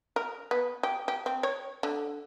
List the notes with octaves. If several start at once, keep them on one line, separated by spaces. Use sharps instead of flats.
A#4
B3
G4
G4
C4
C#5
D3